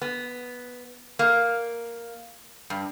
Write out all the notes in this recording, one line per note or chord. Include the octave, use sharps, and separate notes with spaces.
B3
A#3
G2